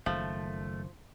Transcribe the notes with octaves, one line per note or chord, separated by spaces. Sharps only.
F#1 D#3 F3 A3